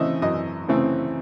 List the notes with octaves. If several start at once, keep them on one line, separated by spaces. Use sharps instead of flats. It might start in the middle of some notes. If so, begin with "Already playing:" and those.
Already playing: C#3 E3 A3 C4 D#5 E5
F#2 D#5
C#3 E3 A3 C4